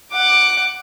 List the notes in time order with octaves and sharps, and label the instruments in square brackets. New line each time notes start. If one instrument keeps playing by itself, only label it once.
[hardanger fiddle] F#5 D6